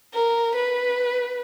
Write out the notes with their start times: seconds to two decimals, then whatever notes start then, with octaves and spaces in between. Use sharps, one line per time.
0.13 A#4
0.55 B4